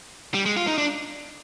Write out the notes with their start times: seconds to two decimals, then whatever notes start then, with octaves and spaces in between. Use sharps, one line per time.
0.34 G3
0.46 G#3
0.57 F4
0.67 D#4
0.78 D4